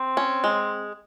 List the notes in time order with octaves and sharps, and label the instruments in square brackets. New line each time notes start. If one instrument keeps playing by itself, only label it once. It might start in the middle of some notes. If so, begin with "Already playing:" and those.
Already playing: [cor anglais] C4
[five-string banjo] C#4
G#3